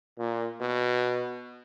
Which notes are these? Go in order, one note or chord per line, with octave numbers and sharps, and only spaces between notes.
A#2
B2